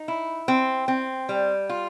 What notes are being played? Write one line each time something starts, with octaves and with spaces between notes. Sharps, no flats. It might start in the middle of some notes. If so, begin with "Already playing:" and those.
Already playing: D#4
E4
C4
C4
G3
F4